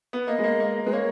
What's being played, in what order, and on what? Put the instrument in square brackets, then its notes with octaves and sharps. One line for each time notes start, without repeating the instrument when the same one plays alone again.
[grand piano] B3
[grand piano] A#3 [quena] D#5
[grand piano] G#3
A#3
A#3
[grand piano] G#3 [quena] B4
[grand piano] A#3 [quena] C#5